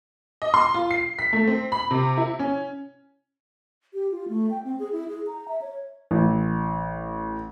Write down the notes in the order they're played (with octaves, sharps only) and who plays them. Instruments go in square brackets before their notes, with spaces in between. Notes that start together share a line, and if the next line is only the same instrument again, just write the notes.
[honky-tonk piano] D#5
C6
F4
C7
B6
A3
C4
B5
C3
E4
C#4
[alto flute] G4
F4
A3
G5
C4
G#4
E4
G#4
A#5
E5
C#5
[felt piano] A1